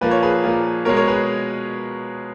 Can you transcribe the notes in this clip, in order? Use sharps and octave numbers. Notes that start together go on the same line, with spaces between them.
A#2 F3 A#3 B4
C#5
G#4 B4
A#2 F3 A#3
B2 G#3 A#4 C#5
A#4 C#5
G#4 B4